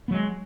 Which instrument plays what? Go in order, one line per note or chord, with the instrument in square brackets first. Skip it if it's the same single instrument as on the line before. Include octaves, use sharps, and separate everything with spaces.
[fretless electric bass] B3
F#3
G#3